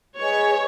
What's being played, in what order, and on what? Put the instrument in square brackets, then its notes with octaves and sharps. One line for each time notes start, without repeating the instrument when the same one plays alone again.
[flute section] G#4 B4 D#5 G#5 [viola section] C#5